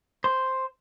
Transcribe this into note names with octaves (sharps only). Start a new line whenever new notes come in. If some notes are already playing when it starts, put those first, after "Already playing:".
C5